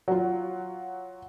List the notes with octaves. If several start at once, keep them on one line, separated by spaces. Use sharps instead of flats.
F#3 F4